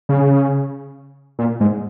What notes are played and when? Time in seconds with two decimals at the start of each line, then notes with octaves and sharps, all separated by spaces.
0.09 C#3
1.39 A#2
1.60 G#2